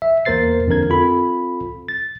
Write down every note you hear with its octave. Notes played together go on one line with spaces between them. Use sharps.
E5
E2 A#3 A#4 C5 A6 C7
F2 D3 D4 A#4 G#6
C4 F4 A4 B5
A6